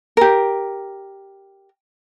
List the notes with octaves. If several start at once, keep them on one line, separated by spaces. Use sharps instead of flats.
G4 A#4